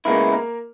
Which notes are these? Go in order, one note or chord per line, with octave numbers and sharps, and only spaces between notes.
C#2 C#3 G#3 A#3 B3 E4 A#4
A#3 A#4